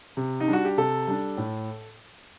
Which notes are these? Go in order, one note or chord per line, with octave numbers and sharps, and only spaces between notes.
C3
D#4
G3 D4 F#4
G4
C3 A4
G3 D4
A2